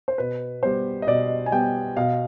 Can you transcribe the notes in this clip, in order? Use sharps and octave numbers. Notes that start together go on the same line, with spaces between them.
C5
B2 B4
G3 B3 C5
D#5
B2 D5
G#5
G3 B3 G5
B2 F5